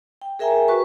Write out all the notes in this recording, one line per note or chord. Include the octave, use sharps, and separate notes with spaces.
G5
G#4 A#4 E5 G5 G#5 A#5
F#4 B4 C#6